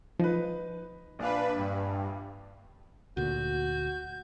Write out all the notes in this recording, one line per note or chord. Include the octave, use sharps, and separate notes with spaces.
F3 D#4 B4
A#1 D4 B4 F5
G2
D2 A#2 F#4 G6